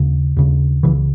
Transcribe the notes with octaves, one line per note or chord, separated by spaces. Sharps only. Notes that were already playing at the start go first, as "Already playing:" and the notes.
Already playing: D#2 C#3
D#2 C#3
C#2 C#3 E3